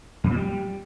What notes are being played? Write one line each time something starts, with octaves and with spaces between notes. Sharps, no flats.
F2
A#2
G3